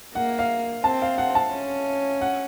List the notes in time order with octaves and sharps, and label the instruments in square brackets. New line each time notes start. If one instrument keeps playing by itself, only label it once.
[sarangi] A#3 [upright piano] F#5
[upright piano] F5
[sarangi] C4 [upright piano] A5
[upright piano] F5
F#5
A5
[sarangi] C#4
[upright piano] F#5